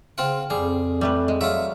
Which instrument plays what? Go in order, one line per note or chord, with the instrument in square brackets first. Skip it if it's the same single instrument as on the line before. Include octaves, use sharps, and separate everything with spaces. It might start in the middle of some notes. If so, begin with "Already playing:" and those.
[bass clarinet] C#3 [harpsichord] C4 F4 F#5
[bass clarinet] F2 [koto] G3 [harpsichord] G#4
[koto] G3 A3 B4
G#3
[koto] F#3 [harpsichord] F4 E5